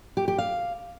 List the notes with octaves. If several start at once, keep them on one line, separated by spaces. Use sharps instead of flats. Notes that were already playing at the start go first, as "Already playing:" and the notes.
G4
G4
F5